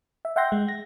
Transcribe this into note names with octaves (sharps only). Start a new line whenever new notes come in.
E5
E5 F#5 G5 C6 G6 A#6
G#3
A#6